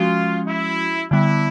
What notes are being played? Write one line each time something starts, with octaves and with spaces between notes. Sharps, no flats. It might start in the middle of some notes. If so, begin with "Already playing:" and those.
Already playing: F3 G#3 C#4 F4 F#4
E4
D3 G3 B3 E4